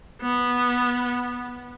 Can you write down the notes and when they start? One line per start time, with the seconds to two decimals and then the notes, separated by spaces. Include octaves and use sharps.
0.22 B3